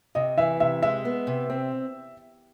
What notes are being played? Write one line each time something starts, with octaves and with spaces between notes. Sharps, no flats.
C3 D#5
E3 E5
C3 E5
G#3 E5
B3
C3
C4